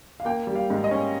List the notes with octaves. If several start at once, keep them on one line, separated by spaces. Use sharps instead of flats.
F5
A#3 G5
G3
F5
G#2
D#5
C#4